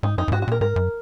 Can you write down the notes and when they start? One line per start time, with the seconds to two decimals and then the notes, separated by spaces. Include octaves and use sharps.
0.03 G#2 D#4
0.18 F#2 D#4
0.28 F#2
0.32 G#2 F#4
0.42 F#4
0.48 A#2 A#4
0.61 G#2 A#4
0.76 F#2